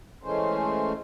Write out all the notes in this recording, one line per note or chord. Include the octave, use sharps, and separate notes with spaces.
E3 G#3 A3 C#4 C5